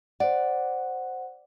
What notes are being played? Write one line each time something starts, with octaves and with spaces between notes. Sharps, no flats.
C5 D5 F#5